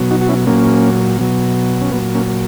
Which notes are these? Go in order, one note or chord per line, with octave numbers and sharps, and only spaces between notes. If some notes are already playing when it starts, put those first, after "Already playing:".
Already playing: B2 F#3
D#4 F#4
F#4
C#4 E4
A#2 F#3 A#3 C#4
B2 F#3
C#4
A#2 F#3 B3
A#3 C#4